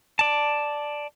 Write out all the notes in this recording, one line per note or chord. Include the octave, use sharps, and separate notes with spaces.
D5 A5